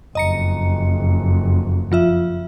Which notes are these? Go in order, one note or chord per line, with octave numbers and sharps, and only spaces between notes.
F#1 F2 D#5 A#5 C#7
F3 F4 E5